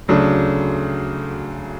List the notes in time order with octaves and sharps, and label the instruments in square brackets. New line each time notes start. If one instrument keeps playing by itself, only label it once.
[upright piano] D2 C#3 F#3 A3 D4